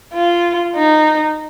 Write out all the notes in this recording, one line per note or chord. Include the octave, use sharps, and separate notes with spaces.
F4
D#4